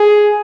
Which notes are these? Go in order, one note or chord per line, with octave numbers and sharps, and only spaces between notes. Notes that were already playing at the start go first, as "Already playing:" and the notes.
Already playing: G#4